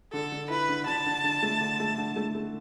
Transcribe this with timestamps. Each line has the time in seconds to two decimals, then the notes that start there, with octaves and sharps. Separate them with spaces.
0.13 D3 A4
0.32 D3
0.50 E4 B4
0.69 D3
0.86 D3 A5
1.06 D3
1.24 D3
1.42 A3
1.61 D3
1.80 A3
1.98 D3
2.16 A3
2.35 A3